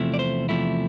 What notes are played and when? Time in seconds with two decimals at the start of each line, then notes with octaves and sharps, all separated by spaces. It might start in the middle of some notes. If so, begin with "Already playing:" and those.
Already playing: E2 C3 F3 A3 E4
0.14 D5
0.19 C5
0.49 E2 C3 F3 A3 E4